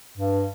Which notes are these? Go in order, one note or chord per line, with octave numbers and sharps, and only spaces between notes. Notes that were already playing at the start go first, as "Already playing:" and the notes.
G2